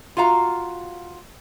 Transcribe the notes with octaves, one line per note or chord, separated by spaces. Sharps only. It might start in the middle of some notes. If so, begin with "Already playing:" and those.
F4 F#4 F5 A#5